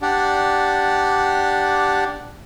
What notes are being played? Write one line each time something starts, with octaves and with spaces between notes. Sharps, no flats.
D4 G4 D5 F#5